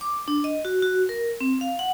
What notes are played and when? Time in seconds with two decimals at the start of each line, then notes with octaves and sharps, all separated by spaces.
0.01 D6
0.28 D4
0.44 D#5
0.65 F#4
0.82 F#4
1.09 A#4
1.41 C4
1.61 F5
1.79 F#5